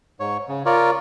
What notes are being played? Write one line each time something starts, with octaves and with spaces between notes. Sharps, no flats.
G#2 C#5
C#3
F4 A#4 C#5 D5